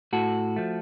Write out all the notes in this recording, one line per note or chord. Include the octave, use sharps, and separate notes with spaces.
A2 F#4 A4
F3 A3